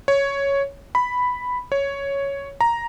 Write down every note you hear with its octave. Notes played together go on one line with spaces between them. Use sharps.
C#5
B5
C#5
A#5